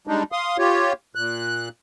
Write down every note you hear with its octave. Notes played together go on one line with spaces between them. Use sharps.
G3 G#3 D4 D#4
F5 C6 D#6
F4 G4 C#5
A#2 F#6